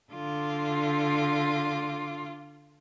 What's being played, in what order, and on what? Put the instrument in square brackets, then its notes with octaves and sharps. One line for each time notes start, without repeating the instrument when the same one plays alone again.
[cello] D3 F4